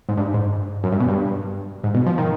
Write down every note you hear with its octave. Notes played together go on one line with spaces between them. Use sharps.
G#2
G2
G#2
F#2
G2
B2
G2
G#2
B2
F3
D#3